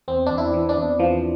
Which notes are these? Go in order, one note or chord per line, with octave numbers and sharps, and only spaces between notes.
E2 C4
E2 D4
E4
E3
D4
E2
E3 F3